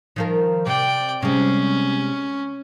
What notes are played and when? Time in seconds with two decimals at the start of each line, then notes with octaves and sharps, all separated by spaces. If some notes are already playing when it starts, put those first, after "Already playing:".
0.16 D#3 F3 A#4
0.67 C3 D5 G5
1.22 C3 G3 G#3 C#4